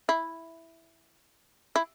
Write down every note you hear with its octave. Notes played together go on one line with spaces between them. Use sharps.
E4
E4